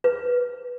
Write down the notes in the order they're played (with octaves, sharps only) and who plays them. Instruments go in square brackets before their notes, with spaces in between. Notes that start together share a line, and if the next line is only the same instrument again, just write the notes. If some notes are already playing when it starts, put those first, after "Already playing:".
[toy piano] B4